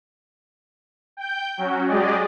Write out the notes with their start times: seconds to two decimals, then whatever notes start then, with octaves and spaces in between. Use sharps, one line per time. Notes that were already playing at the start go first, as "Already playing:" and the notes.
1.17 G5 G6
1.58 F#3 C#4 F#4
1.88 F#3 G#3 G4 G#4 D5 D#5